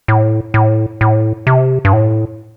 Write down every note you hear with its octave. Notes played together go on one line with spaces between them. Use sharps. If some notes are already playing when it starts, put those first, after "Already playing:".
A2
A2
A2
C3
G2
A2